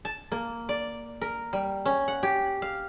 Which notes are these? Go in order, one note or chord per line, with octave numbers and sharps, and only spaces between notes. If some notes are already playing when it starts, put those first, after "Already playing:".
A5
A#3
D5
A#4
G3
C#4
F#5
G4
F5